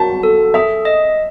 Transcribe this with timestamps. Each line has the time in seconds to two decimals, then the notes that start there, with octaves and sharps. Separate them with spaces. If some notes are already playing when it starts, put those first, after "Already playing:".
Already playing: F#4 A5
0.23 A4
0.54 G#4 E5
0.85 D#5